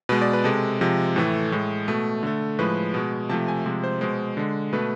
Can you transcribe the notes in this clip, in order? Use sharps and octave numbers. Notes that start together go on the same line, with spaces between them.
B2 G#3 B4
D5
B4
C3 G#3 A4
C3 F3 G#3
A2 E3 A3 A4
A2 G#3
B2 A3
D3 A3
A2 F3 G#3 B4
B2 G#3
C3 F3 A3 A5
G#5
C3 F3 G#3
C5
B2 G#3 C5
D3 G#3
B2 A3 B4